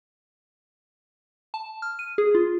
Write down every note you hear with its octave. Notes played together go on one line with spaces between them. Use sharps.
A5
F6
D#7
G#4
F4